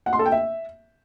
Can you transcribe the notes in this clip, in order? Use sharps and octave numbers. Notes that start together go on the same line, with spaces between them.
F#5
C6
A4
G5
E5